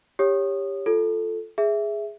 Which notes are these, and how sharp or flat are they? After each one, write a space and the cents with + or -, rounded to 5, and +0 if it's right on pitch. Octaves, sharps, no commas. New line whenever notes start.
G4 +15 C#5 +0 D#6 -15
F4 +0 A4 +0
G#4 +0 E5 +0